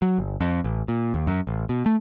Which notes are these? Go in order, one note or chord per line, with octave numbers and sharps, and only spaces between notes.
F#3
G1
F2
A1
A#2
D#2
F#2
A1
B2
A3